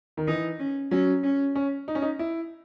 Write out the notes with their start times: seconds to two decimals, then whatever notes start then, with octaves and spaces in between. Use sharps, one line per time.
0.17 D#3
0.28 E3 D#4
0.59 C#4
0.91 F#3 C#4
1.23 C#4
1.55 C#4
1.88 D#4
1.95 C#4
2.02 D#4
2.19 E4